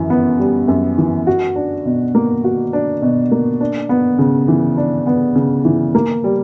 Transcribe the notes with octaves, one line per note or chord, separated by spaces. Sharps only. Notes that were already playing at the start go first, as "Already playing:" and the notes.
Already playing: F#2 E3
B3
G3
F#2
E3
F#4
D4
B2
A#3
F#4
D4
B2
A#3
D4
B3
C#3
E3
D4
B3
C#3
E3
A#3
G3